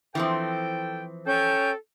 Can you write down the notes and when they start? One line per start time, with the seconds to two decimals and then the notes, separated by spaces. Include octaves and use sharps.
0.15 E3 F3 C4 A4 G5
1.27 C#4 A4 G5 G6